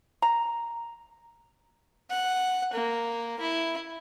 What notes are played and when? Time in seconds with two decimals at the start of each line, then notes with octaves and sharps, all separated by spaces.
0.22 A#5
2.10 F#5
2.73 A#3
3.40 E4